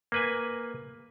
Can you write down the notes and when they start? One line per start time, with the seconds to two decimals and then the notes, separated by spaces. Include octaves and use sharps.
0.12 A#3 B4 G#5